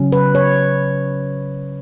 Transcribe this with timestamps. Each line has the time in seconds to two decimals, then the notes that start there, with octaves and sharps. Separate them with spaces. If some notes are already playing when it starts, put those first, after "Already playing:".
Already playing: C#3 F#3 C#4
0.12 B4
0.35 C#5